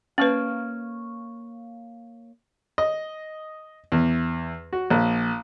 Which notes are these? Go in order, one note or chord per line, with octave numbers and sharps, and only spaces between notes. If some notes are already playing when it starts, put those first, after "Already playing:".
A#3 C#4 B4 C#5 F5
D#5
E2
F#4
A#1